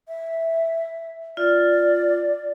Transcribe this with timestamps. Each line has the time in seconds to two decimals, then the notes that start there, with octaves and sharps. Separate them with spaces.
0.08 E5
1.37 F4 D5